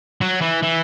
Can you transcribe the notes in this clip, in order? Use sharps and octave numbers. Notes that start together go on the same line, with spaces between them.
F#3
E3
E3